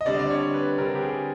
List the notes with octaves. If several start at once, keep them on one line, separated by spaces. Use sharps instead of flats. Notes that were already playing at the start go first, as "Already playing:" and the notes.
D#5
D3 G3 C4 D5
D5
C#5
B4
D3 G3 C4 A#4
G4
G#4